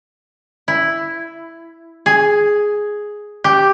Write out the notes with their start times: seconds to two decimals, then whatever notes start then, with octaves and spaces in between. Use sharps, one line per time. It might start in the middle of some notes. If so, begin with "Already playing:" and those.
0.68 E4
2.06 G#4
3.44 G4